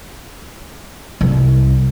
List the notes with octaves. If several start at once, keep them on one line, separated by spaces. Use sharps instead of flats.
C2